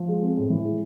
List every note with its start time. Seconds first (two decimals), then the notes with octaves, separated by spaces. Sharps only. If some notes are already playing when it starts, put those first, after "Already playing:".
Already playing: F3
0.08 G#3
0.22 C4
0.37 A2
0.50 E3
0.65 G#3